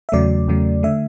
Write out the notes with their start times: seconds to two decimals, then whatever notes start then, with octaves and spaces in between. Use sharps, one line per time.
0.09 E5
0.12 E2 C#3 F#3 A3 D5
0.48 E2 C#3 F#3 A3
0.83 D3 A3 E5